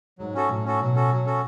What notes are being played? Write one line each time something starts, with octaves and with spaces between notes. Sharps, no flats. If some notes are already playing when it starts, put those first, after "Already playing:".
G#2 F#3
C#4 F#4 A4
A2 F#3
C#4 F#4 A4
B2 F#3
C#4 F#4 A4
F#3
C#4 F#4 A4